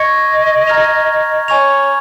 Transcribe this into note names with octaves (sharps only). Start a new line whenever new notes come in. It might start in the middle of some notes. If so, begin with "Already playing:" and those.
Already playing: D#5 C#6 G#6 C#7
A#5 F6 G#6 F7
C#5 G#5 C#6 G#6 F7